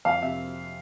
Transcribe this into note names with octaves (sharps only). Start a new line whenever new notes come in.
F2 F5
C3 E5